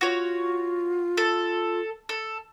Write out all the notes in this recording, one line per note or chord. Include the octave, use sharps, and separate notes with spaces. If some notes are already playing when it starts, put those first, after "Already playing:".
F4 F#4 C#5
A4
A4